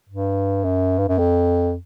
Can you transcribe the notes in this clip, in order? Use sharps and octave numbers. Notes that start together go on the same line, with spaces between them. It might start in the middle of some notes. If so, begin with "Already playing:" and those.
G2
F#2
G2
F#2
F2